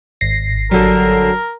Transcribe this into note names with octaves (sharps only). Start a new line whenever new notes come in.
G#1 A#6 C7
D3 F#3 G3 A#4